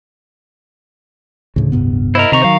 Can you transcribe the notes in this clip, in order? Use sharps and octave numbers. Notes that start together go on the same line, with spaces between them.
D2 A2 C#3 E3
D1 G2 C3 B3
E4 A#4 C5 D#5
C3 D#3 C4 A#5 C#6
F#3 F5